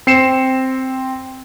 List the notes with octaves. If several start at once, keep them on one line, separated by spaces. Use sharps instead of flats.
C4 C7 C#7 E7